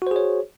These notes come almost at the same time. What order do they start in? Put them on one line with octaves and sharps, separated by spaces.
F#4 C5 G#4 C#5